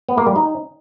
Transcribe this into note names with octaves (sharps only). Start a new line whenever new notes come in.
B3
A#3
G3
D#4